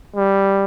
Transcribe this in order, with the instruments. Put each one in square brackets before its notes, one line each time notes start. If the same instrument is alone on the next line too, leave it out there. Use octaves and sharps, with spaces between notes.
[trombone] G3